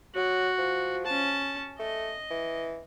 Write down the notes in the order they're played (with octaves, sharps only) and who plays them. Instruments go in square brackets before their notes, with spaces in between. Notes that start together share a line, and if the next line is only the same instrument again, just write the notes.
[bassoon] F#3 [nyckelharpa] F#4
[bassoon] F3
[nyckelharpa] C#4 A5
[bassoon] A3 [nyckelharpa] D#5
[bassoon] E3